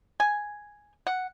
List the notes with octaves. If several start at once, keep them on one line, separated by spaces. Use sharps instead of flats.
G#5
F#5